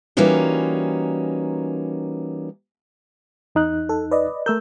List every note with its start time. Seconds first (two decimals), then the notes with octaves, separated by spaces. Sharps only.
0.17 E3 G3 A#3 C#4 D#4 F#4
3.55 E2 D#4 F#6
3.89 A4
4.11 B4 D5 D#5
4.46 A3 A#4 E6 G6